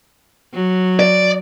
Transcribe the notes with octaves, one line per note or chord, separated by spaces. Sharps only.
F#3
D5